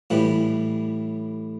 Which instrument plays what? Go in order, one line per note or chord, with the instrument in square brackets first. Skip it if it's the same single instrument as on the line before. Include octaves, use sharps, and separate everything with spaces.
[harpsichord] A2 E3 G3